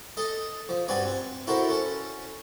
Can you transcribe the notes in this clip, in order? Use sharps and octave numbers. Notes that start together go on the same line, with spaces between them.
A4 D#5
F3
G2 C4 F#4 D5 G#5
C4
E4 F#4 A4 A#4 C5
C#4 A4